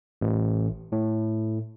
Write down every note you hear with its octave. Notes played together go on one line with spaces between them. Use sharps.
A1
A2